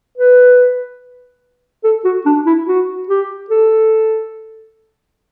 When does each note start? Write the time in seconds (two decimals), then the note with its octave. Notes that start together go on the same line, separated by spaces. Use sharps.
0.18 B4
1.84 A4
2.05 F#4
2.26 D4
2.46 E4
2.67 F#4
3.09 G4
3.50 A4